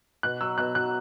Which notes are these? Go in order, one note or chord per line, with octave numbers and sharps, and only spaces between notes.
B2 F#6
F#3 E6
B2 F#6
F#3 F#6